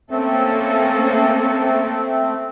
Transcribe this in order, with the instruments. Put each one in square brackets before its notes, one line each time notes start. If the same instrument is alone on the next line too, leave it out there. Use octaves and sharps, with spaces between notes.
[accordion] A3 C4 [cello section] A#3 C#4 A4